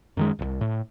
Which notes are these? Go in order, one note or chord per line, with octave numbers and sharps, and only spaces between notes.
F#2 D#3 G#3
D1 C2
A2